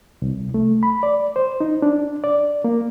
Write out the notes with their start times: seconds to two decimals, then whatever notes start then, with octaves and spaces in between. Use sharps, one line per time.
0.22 C2
0.54 A3
0.83 B5
1.03 D5
1.36 C5
1.60 D#4
1.82 D4
2.24 D5
2.64 A#3